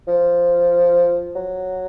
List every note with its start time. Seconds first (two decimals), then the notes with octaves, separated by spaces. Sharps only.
0.08 F3
1.36 F#3